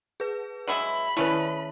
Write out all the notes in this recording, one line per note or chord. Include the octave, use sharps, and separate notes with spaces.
G#4 B4
F#3 G#3 E4 B5
D#3 A3 C#4 E4 B4